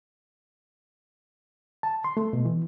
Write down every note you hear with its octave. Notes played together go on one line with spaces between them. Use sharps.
A5
C6
A3
B2
E3